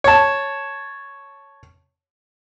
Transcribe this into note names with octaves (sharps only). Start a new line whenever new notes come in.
C#5 A5